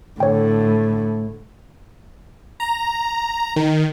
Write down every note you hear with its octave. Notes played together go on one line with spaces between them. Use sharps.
A2 D3 C#5 G5
A#5
D#3